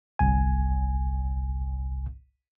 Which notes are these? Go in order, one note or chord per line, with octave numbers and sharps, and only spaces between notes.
G1 C2 G#5